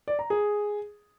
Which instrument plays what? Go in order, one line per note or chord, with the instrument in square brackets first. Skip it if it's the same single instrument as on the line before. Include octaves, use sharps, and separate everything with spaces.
[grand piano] D5
A#5
G#4